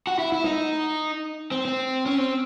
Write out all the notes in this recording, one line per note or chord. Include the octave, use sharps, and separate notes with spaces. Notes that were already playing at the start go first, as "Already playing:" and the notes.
F#4
E4
E4
D#4
C4
C4
C#4
C4